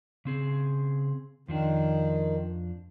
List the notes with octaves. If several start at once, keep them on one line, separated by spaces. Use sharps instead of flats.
C#3 C4 G#4
F2 D#3 F3 D4